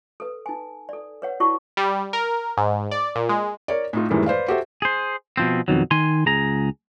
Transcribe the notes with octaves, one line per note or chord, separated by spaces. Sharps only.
A4 B4
D#4 G#5
A4 D5
B4 C#5 F#5
E4 F#4 D5 A5 C#6 D#6
G3
A#4
G#2
D5
A#2
G#3
A#4 C#5 D5
A2 D#4 F4
F#2 A2 D#3 E3 G3 G#3
B4 C5 D5 F5
F#4 G4 A4 C5 E5
G#4 C5
B2 F3 C4
F2 B2 D#3 F#3
D#3 G#5 C6
C#2 G#4 A#5